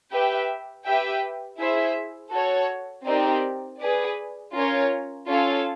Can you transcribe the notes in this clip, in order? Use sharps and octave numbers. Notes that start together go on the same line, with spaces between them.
G4 B4 E5 G5
G4 B4 E5 G5
E4 G#4 C5 E5
F#4 A4 C#5
C4 D#4 G4 A#4 D5
G#4 B4 D5
C#4 F4 A#4 C#5
C#4 F4 A4 C#5 F5